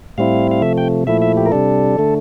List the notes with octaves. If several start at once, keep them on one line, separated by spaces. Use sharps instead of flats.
A2 G3 C4 E4 F5
F5
C3 F3 A3 E5
G5
A#2 F3 A3 E4 E5
E5
G4
A#4
C3 G3 D4 A4
D3 A3